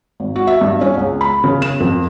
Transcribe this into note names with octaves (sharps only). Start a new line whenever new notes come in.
G#1
F#4
E5
G2
C#4
C#2
B5
C#3
E7
F2